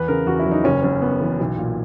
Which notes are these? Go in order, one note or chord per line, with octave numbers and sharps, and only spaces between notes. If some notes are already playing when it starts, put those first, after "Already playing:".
Already playing: E2 B4
C#3 A#4
E2 F#4
E4
F#3
D#4
F#1 C#4
F#2 C#4
B3
E3
B1
A#2